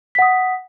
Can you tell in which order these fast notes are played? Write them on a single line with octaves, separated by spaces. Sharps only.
B6 F#5 D#6